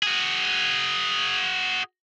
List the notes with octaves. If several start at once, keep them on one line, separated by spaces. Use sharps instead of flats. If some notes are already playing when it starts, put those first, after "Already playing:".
F#4 G#4